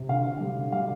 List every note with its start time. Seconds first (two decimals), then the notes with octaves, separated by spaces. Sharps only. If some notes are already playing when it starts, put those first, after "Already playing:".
Already playing: C3
0.09 D3 F5
0.25 D3
0.40 G3
0.57 D3
0.72 G3 F5